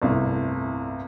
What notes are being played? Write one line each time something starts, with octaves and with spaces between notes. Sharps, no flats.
G1 C2 A2 C3